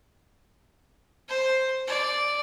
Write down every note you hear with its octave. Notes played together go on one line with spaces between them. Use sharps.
C5
D5